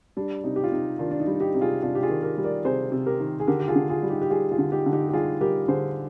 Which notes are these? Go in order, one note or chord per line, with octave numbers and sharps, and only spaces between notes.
G3 D4
C3 D#4
G4
F4
C3 D#4
D#3 D4 F4
D4
D#4
G3
D#4 G4
C3
F4 G#4
C3 D4 F4
G4
F4 G#4
D#3
G4 A#4
G3
A#4 D5
C3 G#4 C5
C3
G4 A#4
D#3
G#4
D3 G4 A#4
G4
F4 G#4
D3
F4 G#4
G3
D#4 G4
G4
G3 F4 G#4
F4 G#4
D3
D#4 G4
D3
D#4 G4
G4
G3 F4 G#4
G3 G4 A#4
D3 G#4 C5